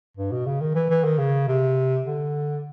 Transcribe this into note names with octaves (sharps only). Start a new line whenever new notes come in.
G2
B2
C#3
D#3
E3
E3
D#3
C#3
C3
D3